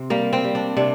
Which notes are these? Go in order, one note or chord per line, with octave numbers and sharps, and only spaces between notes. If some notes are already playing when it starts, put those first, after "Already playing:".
Already playing: C3 C4
G3 A#3
C4
G3
D4
C3 D4